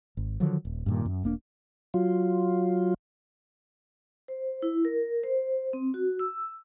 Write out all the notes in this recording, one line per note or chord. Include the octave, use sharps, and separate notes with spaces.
G#1
D3 D#3 F3 F#3
D#1
G2 A#2 D#3
F#2
E1 A#3 D4
F#3 F4
C5
E4
A#4
C5
C4
F#4
E6